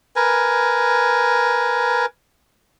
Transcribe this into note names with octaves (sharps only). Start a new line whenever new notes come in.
A#4 B4 G#5